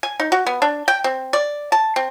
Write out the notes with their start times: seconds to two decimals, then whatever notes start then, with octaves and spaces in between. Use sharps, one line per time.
0.03 G#5
0.20 D#4
0.32 F#4
0.47 B3
0.62 D4
0.88 G5
1.04 C4
1.33 D5
1.72 A5
1.96 C4